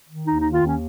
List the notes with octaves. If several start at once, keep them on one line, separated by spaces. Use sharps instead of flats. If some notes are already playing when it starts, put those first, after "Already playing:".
D#3
D#2 D#4
D#3 D#4
F4
D#2 C#4